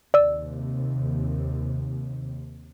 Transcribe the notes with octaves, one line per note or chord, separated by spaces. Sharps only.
D#2 C3 D5 E6